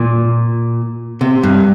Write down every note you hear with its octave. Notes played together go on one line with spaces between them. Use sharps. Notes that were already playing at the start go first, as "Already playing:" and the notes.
Already playing: A#2
C3
G2